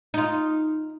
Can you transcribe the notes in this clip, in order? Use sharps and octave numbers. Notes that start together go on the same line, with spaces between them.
D#4 F4